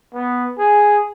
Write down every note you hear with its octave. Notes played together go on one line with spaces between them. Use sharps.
B3
G#4